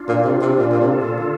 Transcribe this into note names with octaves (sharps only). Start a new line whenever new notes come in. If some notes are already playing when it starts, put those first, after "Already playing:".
Already playing: D4 F4
A#2
C3
C3
A#2 D4 F4
A#2
C3
F4 A4
A#2
D3